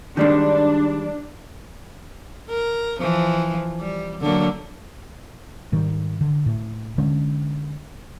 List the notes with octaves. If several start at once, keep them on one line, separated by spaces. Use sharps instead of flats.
D#3 G3 G#3 D4
A#4
E3 F3
G3
D3 F#3 A#3
G#2 D#3 G3
D3
A2
D3 G#3 C#4